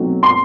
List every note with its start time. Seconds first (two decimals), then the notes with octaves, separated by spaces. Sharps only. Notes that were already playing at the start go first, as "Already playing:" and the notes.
Already playing: B2 F#3 A3 C4 D#4
0.23 C6